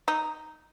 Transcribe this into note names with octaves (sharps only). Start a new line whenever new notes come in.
D#4